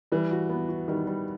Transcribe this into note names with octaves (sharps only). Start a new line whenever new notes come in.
E3 G3
F#4
B3
F#4
D#3 G3
G3